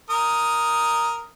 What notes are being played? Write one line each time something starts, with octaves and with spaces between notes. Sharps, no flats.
A#4 D#6